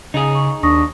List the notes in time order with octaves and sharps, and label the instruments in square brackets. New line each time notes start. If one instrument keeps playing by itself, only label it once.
[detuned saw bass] C#3 [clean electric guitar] D#4 G#4
[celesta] C#6
[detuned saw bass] D#2 [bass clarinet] D4 [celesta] C#6 D#6 A#6